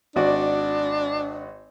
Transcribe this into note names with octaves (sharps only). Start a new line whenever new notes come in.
G#1 D4 F#4 D5